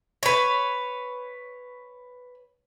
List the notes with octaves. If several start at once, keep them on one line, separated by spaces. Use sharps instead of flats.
B4 C#5